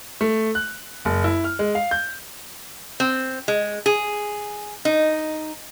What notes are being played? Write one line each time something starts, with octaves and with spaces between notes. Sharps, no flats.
A3
F#6
F#1
E4
F6
G#3
F5
G6
C4
G#3
G#4
D#4